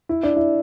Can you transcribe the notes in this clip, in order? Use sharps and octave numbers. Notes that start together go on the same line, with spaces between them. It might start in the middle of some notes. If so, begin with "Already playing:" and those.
E4
D4
E4